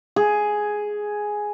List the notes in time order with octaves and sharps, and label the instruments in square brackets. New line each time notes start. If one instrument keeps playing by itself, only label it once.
[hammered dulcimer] G#4